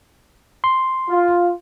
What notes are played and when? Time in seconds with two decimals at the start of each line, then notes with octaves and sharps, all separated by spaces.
0.64 C6
1.09 F4